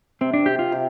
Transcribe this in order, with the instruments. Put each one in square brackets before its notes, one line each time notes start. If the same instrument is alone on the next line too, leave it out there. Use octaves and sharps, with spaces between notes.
[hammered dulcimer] C3 [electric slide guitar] C4
[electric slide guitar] D4
[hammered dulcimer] C3 [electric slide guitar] G4
[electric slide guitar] F4
[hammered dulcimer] C3